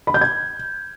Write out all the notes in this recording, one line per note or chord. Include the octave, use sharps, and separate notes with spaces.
B5
G6
G#6